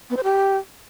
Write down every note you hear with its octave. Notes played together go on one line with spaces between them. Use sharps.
B3
C5
G4